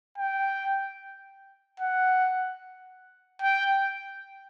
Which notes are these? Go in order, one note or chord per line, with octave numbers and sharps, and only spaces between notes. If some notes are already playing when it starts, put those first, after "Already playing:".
G5
F#5
G5